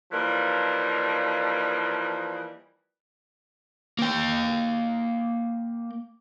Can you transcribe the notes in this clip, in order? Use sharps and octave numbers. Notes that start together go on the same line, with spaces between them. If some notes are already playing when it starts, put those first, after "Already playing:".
E3 F3 G3 A#3 D#4
A#3 G5